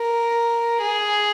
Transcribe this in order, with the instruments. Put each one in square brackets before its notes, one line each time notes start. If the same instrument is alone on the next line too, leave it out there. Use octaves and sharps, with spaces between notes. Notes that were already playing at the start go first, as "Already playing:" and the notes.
Already playing: [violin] A#4
G#4